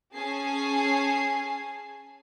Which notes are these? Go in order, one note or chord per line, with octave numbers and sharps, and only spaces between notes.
C#4 G#4 G#5 A5 C7